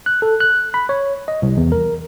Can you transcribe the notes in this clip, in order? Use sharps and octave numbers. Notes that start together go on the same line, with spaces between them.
F#6
A4
F#6
B5
C#5
D#5
C2
E2
A#4